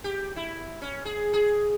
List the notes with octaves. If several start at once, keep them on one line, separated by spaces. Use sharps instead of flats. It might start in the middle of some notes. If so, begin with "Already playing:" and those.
G4
E4
C#4
G#4
G#4